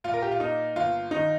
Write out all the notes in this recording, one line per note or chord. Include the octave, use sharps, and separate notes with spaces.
A#2 F4
A#4
G4
F4
A#3 D#4
G1 F4
D#3 D#4